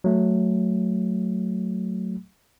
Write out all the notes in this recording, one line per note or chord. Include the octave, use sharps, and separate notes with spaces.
F#3 A3